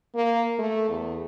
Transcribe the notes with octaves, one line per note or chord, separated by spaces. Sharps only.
A#3
A3
E2